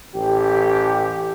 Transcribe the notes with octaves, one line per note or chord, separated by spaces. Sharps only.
A1 G4